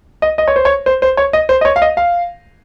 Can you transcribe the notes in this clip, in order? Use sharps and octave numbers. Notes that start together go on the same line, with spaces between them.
D#5
D#5
C#5
C5
C#5
C5
C5
C#5
D#5
C5
D#5
C#5
F5
D#5
F5